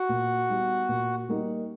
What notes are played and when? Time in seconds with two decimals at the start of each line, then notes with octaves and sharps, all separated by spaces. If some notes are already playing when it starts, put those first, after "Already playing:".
Already playing: F#4
0.09 A#2
0.49 G3 B3 D#4
0.89 A#2
1.29 G3 A#3 D#4